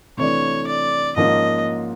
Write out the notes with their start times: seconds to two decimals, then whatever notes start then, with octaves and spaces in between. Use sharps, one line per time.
0.18 C3 E3 A3 D4 C#5
0.67 D5
1.16 G#2 F3 A#3 C#4 D#5